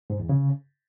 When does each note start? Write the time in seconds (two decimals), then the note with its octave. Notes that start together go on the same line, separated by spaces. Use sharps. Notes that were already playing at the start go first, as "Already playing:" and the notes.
0.10 G#2
0.20 E2
0.29 C#3